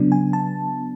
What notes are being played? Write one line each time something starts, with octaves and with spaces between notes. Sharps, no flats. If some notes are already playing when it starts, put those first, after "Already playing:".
Already playing: C#3 F#3 B3 D4
G#5
A5